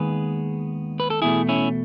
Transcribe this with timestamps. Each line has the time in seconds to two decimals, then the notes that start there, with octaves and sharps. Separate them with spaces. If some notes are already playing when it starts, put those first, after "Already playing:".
Already playing: D#2 D#3 G#3 B3 G#4 B4
1.00 B4
1.10 A4
1.22 E2 B2 A3 E4 G#4
1.49 C#4 E4